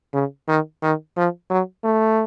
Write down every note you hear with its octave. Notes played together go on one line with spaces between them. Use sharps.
C#3
D#3
D#3
F3
F#3
A3